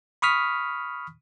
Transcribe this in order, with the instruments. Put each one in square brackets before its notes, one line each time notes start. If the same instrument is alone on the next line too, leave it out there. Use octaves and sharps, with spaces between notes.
[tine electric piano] B5 C#6 D#6 F6 B6